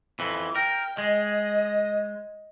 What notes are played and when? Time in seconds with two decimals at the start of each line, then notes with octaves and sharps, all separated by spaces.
0.19 F2 E3
0.56 A#4 G5
0.98 G#3 D#5